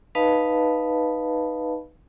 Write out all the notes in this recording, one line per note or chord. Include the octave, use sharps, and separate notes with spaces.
D#4 B4 D#5 F5 A5 B5